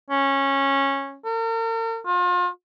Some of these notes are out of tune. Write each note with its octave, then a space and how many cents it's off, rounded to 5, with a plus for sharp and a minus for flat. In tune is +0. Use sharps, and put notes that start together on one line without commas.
C#4 -15
A#4 -45
F4 +35